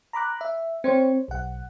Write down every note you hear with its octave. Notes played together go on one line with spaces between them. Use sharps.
A#5 B5 D6 F#6
E5
C4 C5 C#5
B1 F#5